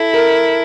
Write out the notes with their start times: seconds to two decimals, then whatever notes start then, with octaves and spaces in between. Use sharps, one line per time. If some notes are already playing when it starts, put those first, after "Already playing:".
Already playing: E4 A4
0.13 A#4